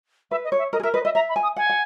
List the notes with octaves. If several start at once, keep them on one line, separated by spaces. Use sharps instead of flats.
B4 E5
D#5
C#5
E5
A#4 D#5
G#4
A#4 E5
B4 D#5
D#5 E5
E5 A#5
B5
G#5
D#6
F#5 G#5
F#5